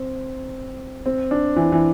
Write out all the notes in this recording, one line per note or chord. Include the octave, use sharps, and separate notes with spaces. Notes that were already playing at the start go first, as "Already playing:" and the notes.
Already playing: C4
C4
D4
E3
E3